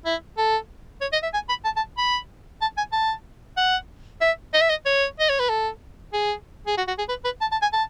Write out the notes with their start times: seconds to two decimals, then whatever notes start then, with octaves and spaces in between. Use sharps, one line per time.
0.06 E4
0.38 A4
1.01 C#5
1.13 D#5
1.23 E5
1.34 G#5
1.49 B5
1.65 A5
1.77 A5
1.98 B5
2.62 A5
2.77 G#5
2.93 A5
3.57 F#5
4.21 E5
4.54 D#5
4.61 E5
4.70 D#5
4.86 C#5
5.20 D#5
5.29 C#5
5.40 B4
5.49 A4
6.13 G#4
6.67 G#4
6.78 F#4
6.88 F#4
6.98 G#4
7.09 B4
7.25 B4
7.41 A5
7.52 A5
7.62 G#5
7.73 A5